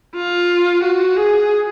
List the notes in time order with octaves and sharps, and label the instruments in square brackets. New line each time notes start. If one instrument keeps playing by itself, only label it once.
[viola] F4
F#4
G#4